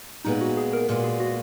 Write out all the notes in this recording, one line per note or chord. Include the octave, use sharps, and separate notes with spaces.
A#2 G#3 B3 D#4
F#4
G#4
A#4
A#2 G#3 B3 A#4
G#4
F#4